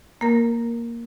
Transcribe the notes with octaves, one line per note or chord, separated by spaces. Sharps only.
A#3 A#4